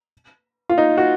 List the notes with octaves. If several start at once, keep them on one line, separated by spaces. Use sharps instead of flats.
F4
D#4
F#4